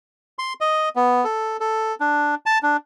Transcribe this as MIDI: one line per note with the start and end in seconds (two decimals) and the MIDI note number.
0.39 0.53 84
0.61 0.89 75
0.96 1.24 59
1.24 1.57 69
1.60 1.95 69
2.00 2.35 62
2.46 2.58 81
2.63 2.77 62